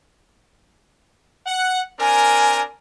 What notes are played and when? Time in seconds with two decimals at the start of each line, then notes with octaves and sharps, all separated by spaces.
1.47 F#5
2.00 C4 D4 A#4 G#5